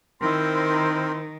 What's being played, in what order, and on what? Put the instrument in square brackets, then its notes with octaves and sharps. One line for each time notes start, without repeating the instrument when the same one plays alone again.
[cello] D#3 [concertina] C4 A#4 [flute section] E4 C5 C6